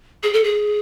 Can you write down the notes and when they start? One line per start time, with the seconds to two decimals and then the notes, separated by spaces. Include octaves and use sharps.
0.23 G#4
0.33 A4
0.44 G#4